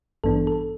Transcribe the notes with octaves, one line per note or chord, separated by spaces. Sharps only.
A1 G2 E3 B3 D4 A4
A4